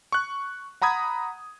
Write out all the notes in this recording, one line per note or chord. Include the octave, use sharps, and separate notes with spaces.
C#6 F#6
F#5 A#5 B5 D#6 G#6